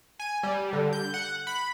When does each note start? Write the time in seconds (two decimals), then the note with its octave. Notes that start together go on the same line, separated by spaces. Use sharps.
0.19 G#5
0.43 G3
0.73 D3
0.93 G6
1.14 F#5
1.47 B5